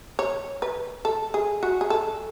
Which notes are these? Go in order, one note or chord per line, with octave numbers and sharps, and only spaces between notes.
C#5
B4
A4
G#4
F#4
G#4
A4